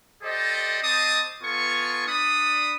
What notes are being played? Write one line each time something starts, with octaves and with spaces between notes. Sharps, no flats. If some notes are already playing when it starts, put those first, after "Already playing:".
G4 A4 C5 D5 D#5
C4 C5 D#5 A5 D6 D#6
B3 F4 A4 G#5 C#6
D4 B5 D#6